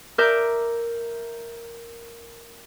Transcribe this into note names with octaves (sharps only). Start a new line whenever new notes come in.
A#4 E5 D6 G6